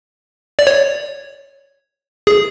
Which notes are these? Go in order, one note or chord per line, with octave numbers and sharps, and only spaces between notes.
D5
C#5
G#4